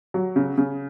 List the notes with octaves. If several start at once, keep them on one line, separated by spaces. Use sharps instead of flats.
F#3
C#3
C#3